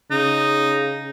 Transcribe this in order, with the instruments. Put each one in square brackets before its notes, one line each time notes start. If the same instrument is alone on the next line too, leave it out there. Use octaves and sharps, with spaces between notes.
[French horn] C#3 [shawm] D#4